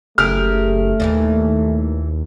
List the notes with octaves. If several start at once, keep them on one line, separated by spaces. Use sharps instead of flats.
F#1 A3 G4 G#4 A#4 F6
D#2 A#2 D#3 E3